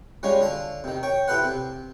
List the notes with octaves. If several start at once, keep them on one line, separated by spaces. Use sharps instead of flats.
G3 G#3 C#4 F4 C#5
D3 F4 A5
C3 D#3
C#5 G5
E4 G4 A4 B4 C5 F#5
C3